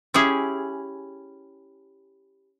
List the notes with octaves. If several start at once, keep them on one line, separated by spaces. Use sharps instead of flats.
C#4 E4 G4 G#4